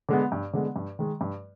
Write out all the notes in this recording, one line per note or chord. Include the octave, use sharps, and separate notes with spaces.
D3 G#3 B3
G2
D3 G#3 B3
G2
D#3 G#3
G2